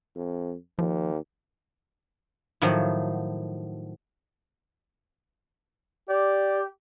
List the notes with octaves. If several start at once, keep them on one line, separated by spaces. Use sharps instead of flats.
F2
D#2 F3
A2 D#3 F3 F#3
G4 D5